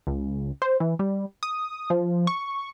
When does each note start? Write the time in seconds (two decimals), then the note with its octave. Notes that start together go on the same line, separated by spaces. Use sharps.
0.07 C#2
0.62 C5
0.80 E3
0.99 G3
1.43 D#6
1.90 F3
2.27 C#6